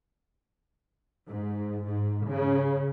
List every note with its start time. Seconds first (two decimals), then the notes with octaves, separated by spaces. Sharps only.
1.28 G#2
1.88 G#2
2.29 C#3